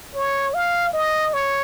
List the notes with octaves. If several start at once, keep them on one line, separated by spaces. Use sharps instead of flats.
C#5
F5
D#5
C#5